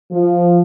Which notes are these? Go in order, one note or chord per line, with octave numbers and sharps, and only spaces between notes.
F3